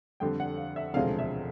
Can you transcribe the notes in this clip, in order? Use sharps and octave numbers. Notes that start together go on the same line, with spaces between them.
F2 D3 G3 G5
F#5
F5
E5
E1 D2 C3 F3 G#3 F5
E5